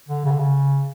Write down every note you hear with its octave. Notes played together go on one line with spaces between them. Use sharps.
D3
C#3
D3
C#3